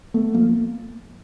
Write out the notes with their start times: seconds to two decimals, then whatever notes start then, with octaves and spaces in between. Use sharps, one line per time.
0.14 A3 B3
0.34 F3 A#3